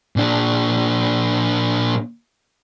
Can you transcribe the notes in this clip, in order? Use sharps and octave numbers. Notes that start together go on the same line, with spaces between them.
A#2 D4